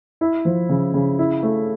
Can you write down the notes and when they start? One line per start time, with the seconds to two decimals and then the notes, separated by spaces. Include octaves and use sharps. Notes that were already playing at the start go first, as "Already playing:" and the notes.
0.21 E4
0.45 F3
0.69 C#3
0.94 C#3
1.19 E4
1.43 A3